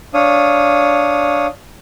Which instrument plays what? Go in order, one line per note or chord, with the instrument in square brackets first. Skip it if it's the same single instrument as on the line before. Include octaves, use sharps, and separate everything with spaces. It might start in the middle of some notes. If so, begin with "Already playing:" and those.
[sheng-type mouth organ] D4 C#5 F5 D#6